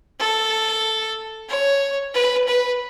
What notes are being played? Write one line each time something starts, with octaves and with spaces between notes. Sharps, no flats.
A4
C#5
B4
B4